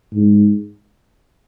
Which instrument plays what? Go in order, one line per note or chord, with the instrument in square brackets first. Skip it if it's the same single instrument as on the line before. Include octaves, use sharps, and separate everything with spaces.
[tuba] G#2